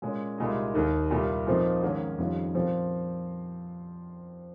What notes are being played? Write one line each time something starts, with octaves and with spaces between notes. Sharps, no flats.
A#2 G#3 C#4
C2 A#2 G#3 D#4
D#2 D#3 A#3
C2 A#2 G3 A#3
A#2 F3 C4 D#4
G#2 D#3 A#3 C#4
F2 D#3 G3 C#4 F4
A#2 F3 C4